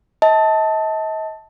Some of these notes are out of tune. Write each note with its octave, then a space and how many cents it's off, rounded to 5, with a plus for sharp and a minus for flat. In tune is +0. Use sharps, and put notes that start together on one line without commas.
D#5 +40 A5 +0